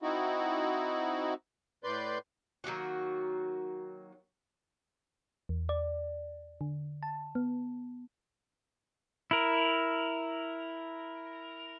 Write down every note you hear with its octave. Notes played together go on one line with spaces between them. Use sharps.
C4 D#4 E4 F#4
A2 B4 D5 C6 G6
D#3 F#3 A#3 F#4
E2
D5
D3
A5
B3
E4 A#4